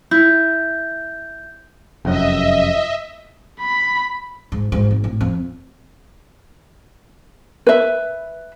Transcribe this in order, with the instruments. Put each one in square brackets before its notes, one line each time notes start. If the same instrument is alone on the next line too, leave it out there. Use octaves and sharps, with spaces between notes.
[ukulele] E4 [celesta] G6
[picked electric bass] F1 F#2 [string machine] D#5 E5
[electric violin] B5
[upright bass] G#2
G#2
G#1
A2
F2
[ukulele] B4 E5